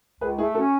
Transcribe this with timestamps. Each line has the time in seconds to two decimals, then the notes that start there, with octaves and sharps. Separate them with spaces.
0.21 C#2 G#4 B4
0.38 A3 E4 G#4
0.55 C#4 F#4 A4